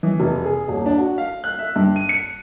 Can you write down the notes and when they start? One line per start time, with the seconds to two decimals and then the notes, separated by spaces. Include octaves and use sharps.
0.03 E3
0.20 F1
0.45 G#4
0.68 D#1
0.86 D4
0.98 F#4
1.18 F5
1.44 F#6
1.59 E5
1.76 G2
1.96 D#7
2.09 C#7